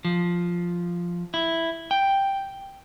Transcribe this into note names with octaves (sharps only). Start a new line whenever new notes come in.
F3
E4
G5